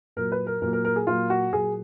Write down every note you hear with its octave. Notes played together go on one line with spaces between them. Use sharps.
A#2 F#3 A#3 A#4
B4
A#4
A#2 F#3 A#3 A#4
A#4
A#4
G#4
A#2 F#3 A#3 F4
F#4
A#2 F#3 A#3 G#4